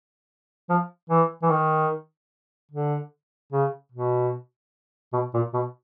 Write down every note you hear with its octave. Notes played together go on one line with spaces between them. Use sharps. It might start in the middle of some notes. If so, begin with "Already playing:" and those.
F3
E3
E3
D#3
D3
C#3
B2
B2
A#2
B2